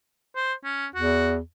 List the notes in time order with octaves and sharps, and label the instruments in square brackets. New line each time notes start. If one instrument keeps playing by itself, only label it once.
[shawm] C5
C#4
[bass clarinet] E2 [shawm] F#4